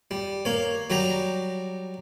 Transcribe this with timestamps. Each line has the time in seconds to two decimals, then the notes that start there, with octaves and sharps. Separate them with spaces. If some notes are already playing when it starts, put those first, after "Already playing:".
0.11 G3
0.45 A#3 C#5
0.90 F#3 G3 G4 A#5